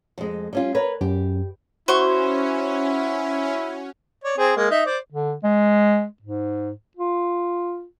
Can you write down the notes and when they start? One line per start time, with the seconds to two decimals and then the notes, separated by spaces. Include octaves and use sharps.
0.18 F2 G#3
0.53 G3 C#4 F4
0.75 A#4 B4 C#5
1.01 F#2 G4
1.88 C#4 E4 F#4 C5 C#6
4.24 C#5 D5
4.38 C4 G#4 C5
4.57 G#3 A#3
4.71 D#4 D#5 E5
4.86 C5 D5
5.11 D3
5.44 G#3
6.22 G#2
6.97 F4